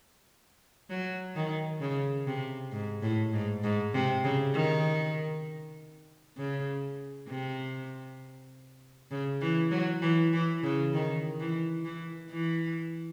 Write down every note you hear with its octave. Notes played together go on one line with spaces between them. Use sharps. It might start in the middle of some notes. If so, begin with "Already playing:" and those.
F#3
D#3
C#3
C3
G#2
A2
G#2
G#2
C3
C#3
D#3
C#3
C3
C#3
E3
F#3
E3
E3
C#3
D#3
E3
E3
E3